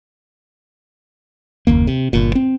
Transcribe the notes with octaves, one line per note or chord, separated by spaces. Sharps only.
F#1 D#2 A#3
C3
G1 A#2
C4